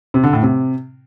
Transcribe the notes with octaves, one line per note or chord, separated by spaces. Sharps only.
C3
D3
A2
C3